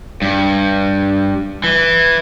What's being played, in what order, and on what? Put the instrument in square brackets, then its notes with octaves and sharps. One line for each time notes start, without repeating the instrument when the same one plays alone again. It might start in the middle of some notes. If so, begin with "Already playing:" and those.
[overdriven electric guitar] G2
E3